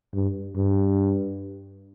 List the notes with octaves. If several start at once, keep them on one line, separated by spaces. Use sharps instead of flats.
G2
G2